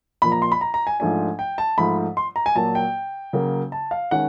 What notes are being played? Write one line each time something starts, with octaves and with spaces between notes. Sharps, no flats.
A#2 F3 A#3 B5
A#5
C6
B5
A#5
A#5
G#5
G#2 F3 A3 D4 G#5
G5
A5
G#2 F3 A3 B5
C6
A#5
G#5
A#2 F#3 A#3 A5
G5
C#3 F#3 A#3
A5
F5
D#3 G#3 C#4 F#5